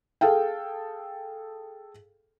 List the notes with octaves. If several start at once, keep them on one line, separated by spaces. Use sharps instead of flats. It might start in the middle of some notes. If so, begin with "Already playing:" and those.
G#4 A4 F5 G5